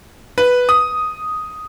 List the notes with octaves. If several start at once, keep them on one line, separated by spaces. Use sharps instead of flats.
B4
D#6